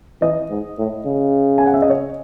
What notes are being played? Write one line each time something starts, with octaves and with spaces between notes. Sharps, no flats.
E3 D#5
G#2
A2
C#3
G#5
F#5
E5
D#5
C#5